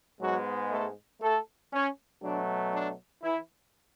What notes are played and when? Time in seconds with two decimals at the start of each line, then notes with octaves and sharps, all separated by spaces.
0.20 G#2 F#3 G#3 B3 F#4
0.71 A3 A4
1.21 A3 A4
1.72 C#4
2.23 B2 F#3 A3 D4
2.73 D4
3.23 E3 E4